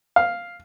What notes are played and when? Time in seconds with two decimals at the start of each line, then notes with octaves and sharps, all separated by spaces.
0.16 F5